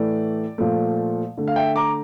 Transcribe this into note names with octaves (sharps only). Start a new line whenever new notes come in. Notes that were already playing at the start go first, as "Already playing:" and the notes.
Already playing: A2 E3 A3 D5
A#2 F3 A3
D3 A3
F5
E5 G5
A#5 D6